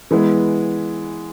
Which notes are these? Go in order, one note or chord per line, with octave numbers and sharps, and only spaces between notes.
E3 G#3 B3